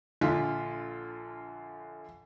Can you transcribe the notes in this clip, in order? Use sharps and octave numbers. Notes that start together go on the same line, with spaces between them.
A#1 D3 F4 B6